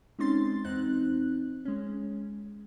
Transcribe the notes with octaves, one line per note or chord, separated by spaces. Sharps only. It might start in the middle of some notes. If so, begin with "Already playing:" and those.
G#3 C4 C#4 D#4 C6 A6
E2 C4 D#4 F#6
G#3 C#4